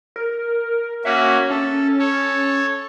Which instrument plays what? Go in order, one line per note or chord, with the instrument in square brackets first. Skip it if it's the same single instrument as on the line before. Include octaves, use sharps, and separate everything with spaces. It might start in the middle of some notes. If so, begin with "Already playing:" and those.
[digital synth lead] A#4
[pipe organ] A#3 C#4 F#4 [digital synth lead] E5
[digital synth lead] C#4 [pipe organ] A4
[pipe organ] A4 C#5